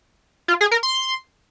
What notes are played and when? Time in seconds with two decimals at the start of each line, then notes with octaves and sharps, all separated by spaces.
0.48 F4
0.61 G#4
0.71 A#4
0.83 C6